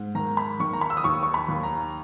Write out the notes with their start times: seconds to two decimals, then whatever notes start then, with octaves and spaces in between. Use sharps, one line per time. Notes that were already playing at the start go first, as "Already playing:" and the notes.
Already playing: G#2
0.15 D#3 A#5
0.37 B5
0.60 D#3 C#6
0.73 A#5
0.81 B5
0.90 E6
0.97 D#6
1.04 D#2 C#6
1.23 C#6
1.34 B5
1.48 D#2
1.63 A#5